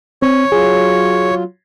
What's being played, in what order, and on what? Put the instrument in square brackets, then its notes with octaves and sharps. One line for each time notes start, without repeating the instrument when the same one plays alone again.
[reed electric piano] C4 [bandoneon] C#5
[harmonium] F#3 F4 [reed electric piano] G#4